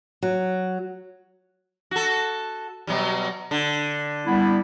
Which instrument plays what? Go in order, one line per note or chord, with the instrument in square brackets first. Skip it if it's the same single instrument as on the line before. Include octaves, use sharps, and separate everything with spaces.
[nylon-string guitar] F#3
[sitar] F#4 A4
B2 F#3 G3
D3
[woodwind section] G3 B3 E4